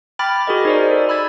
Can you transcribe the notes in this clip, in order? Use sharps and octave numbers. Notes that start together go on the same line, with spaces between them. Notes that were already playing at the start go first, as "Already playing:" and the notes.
G5 B5 D6 F6 A6
F#4 G#4 A#4 D#5
D#4 C5 D5
A4
B5 E6 G#6 A6